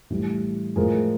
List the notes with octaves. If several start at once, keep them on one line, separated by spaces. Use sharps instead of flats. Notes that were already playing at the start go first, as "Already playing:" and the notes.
A2 E3 G3
A2 F3 G#3 G#4 A#4